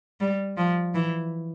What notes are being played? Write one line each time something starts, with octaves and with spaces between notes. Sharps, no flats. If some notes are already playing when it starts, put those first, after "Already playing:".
G3
F3
E3